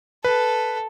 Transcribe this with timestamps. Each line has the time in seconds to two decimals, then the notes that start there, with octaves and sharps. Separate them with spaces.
0.24 A4 B4